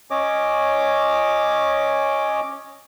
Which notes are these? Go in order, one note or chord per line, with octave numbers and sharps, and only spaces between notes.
C#4 C#5 D#5 D6